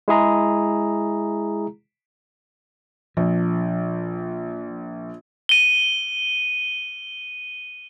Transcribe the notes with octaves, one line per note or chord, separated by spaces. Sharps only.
G#3 E4 G#4 A#5
A#1 F3
D#7 G7